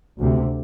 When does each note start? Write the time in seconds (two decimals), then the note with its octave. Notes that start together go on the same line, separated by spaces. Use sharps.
0.19 D2 C3